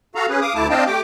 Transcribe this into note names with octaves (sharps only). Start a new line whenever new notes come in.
F#4 A4 F5 A#5
C#4 G#4 B4
F5 D6 D#6
D2 A3 E4 A5 D6
C4 D4 D#5 F5 G5 A5
A3 G4 G5 D6